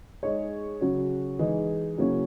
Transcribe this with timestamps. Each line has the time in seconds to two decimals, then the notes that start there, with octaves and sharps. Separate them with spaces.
0.23 G#3 D#4 G#4 C#5
0.81 C#3 F#3 C#4 F#4
1.39 E3 G#3 D#4 G#4
1.98 C#3 F#3 A#3 C#4 E4